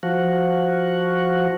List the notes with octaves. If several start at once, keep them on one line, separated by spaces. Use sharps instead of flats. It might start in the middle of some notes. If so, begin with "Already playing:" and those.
F3 F#4